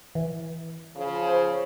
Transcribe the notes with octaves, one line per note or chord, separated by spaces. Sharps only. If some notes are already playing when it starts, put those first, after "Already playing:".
E3
C#3 F3
C5